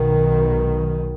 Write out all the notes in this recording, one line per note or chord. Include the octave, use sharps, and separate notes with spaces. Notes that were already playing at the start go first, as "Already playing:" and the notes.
Already playing: B1 B2 D#3